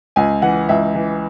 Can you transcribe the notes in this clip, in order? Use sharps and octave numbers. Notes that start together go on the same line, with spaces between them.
C#2 G#5
E3 F#5
C#2 E5
E3